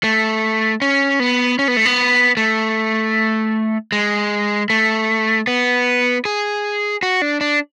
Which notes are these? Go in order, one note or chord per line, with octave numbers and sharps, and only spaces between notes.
A3
C#4
B3
C#4
B3
A3
B3
A3
G#3
A3
B3
G#4
F#4
D4
D4